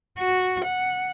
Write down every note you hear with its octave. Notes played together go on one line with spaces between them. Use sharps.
F#4
F#5